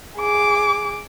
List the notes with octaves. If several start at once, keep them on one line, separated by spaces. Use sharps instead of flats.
G#4 D6